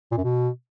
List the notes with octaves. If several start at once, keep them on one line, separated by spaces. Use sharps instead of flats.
A#2
F#2
B2